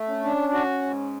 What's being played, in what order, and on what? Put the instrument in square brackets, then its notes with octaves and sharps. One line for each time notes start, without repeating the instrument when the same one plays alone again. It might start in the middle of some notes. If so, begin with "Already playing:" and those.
Already playing: [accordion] A3
[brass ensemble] C#4
[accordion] D4
F#4
G#2